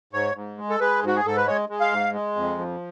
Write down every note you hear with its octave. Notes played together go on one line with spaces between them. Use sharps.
G#2 C#5
G#2
G#3
A4
G#3 B4
G#2 F#4
G#4
G#2 A4
B4
G#3 C#5
G#3
F5
G#2
G#3
F2
F3